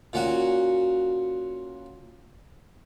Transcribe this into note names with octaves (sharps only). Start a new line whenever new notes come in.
A#2 C#4 F#4